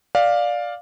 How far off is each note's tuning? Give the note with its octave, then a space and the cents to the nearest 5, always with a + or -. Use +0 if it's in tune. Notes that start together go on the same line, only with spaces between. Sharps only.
D5 +0 F5 +10